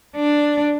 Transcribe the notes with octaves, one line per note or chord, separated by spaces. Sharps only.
D4